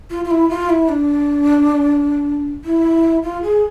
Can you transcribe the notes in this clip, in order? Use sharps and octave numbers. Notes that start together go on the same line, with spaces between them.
F4
F4
E4
F4
E4
D4
E4
F4
G#4